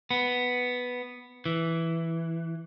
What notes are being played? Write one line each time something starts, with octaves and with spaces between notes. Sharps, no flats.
B3
E3